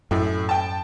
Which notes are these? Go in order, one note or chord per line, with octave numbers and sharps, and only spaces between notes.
F#2 A2 E4
G5 A5